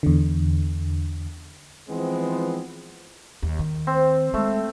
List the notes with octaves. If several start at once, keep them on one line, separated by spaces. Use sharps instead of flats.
E2 D3
E3 F3 G#3 B3 C4
D#2
D#3
C4
G#3 A3